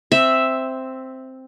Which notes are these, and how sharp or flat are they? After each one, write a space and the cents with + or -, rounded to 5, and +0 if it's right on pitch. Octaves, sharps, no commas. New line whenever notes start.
C4 +0 E5 +0